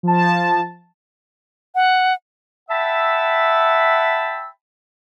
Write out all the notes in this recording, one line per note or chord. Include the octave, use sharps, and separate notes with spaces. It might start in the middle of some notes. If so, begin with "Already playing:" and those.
F3 A5
F#5
E5 F#5 G5 A5 B5 E6